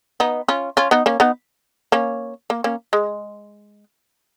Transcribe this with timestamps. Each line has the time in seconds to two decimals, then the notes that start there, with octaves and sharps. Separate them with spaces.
0.20 B3 D#4
0.48 C#4 F4
0.77 C#4 F4
0.91 B3 D#4
1.06 A#3 C#4
1.20 B3 D#4
1.92 A#3 C#4
2.50 A#3
2.64 A#3 C#4
2.93 G#3